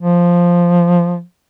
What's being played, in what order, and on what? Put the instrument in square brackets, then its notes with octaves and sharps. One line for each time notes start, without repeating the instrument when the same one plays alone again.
[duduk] F3